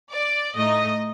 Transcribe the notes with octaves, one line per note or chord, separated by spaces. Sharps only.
D5
A2 A3 D#4 D#5